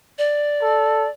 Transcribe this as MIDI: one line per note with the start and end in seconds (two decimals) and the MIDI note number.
0.18 1.09 74
0.62 1.08 69